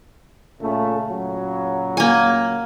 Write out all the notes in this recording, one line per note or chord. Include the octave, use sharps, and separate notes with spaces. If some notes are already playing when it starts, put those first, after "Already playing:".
A#2 C#3 A3
A#2 C#3 F#3
A#3 G#5